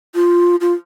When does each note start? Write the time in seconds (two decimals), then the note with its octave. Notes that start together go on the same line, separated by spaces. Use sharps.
0.15 F4
0.61 F4